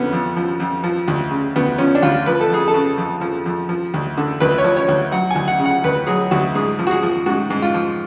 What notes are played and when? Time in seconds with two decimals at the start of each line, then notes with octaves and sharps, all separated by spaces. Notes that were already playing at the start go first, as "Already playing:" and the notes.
Already playing: F2 D3 B3 C#4
0.13 F2
0.36 F3
0.60 F2
0.84 F3
1.08 D2
1.31 C#3
1.56 D2 B3
1.78 F3 C#4
1.95 D4
2.02 D2 F4
2.26 F3 B4
2.40 A4
2.50 F2 G#4
2.68 A4
2.74 C#3
2.98 F2
3.21 F3
3.46 F2
3.69 F3
3.94 D2
4.17 D3
4.40 D2 B4
4.58 C#5
4.64 F3
4.76 C#5
4.88 D2
5.12 F#3 F#5
5.31 D2 G#5
5.48 F#5
5.59 C#3
5.65 F#5
5.84 D2 B4
6.07 F#3 G#4
6.31 D2 F#4
6.55 G#2 G#4
6.79 F3
6.87 F#4
6.91 G#4
7.03 F3
7.26 G#2 F#4
7.50 G#2
7.62 F4
7.74 F3